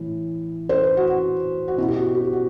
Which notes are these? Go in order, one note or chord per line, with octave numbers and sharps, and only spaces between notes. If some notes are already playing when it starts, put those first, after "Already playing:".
Already playing: A2 E3
C5
B4
F#4
F#4
F#4
B2 E4
G4
F#4
G4
F#4